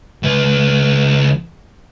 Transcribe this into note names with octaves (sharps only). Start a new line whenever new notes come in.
C#2 B4